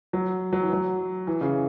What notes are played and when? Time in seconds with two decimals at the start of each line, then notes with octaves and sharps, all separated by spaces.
0.13 F#3
0.53 F#3
0.62 E3
0.73 F#3
1.27 E3
1.41 C#3